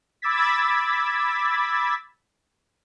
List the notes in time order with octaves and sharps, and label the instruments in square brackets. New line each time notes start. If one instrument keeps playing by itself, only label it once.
[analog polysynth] B5 D6 E6 G#6 A6 B6